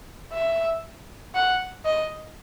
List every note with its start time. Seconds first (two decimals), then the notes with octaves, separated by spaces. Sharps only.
0.33 E5
1.35 F#5
1.85 D#5